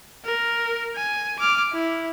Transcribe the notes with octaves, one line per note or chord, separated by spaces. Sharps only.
A#4
G#5
D6 F6
E4